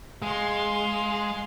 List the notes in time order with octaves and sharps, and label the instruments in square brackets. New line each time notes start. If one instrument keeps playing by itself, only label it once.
[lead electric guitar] G#3 [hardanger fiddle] F5 C6